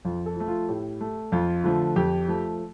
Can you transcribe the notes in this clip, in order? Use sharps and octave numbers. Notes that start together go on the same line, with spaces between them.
F2 F4
A4
F3 A3
F4
A2 G4
A3
F2 F4
D3 F3 A3
F2 G4
F3 A3